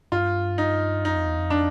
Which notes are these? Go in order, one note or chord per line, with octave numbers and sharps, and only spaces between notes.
G2 F4
D#4
F#2 D#4
F2
E2
F2
D4